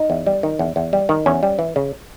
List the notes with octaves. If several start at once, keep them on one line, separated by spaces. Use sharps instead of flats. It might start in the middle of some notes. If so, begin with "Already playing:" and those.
Already playing: D#4
E2
G3
D#3
E2
E2
G3
D#3
E2 C#4
G3
E3
C#3